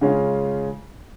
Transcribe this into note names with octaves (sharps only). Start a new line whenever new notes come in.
C#3 G#3 C#4 F4